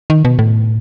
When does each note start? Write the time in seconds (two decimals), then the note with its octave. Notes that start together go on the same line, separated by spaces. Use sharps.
0.10 D#3
0.25 B2
0.39 A2